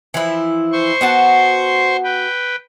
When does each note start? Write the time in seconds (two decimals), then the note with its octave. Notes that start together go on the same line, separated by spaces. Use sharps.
0.14 E3 F3 E4
0.72 C5 C6 C#6
1.01 B3 F#4 A5
2.04 B4 G5